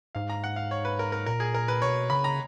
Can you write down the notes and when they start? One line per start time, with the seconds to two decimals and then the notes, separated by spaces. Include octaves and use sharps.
0.15 G#2 F5
0.30 A#5
0.44 F#5
0.56 F5
0.71 C#5
0.85 B4
0.99 A#4
1.12 A#4
1.26 A#2 A#4
1.40 G#4
1.54 A#4
1.68 B4
1.82 B2 C#5
2.10 C#3 B5
2.24 A#5